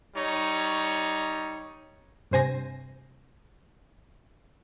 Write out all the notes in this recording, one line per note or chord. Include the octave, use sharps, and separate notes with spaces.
G3 D#4 C#5
G2 C3 C5 G#5 A#6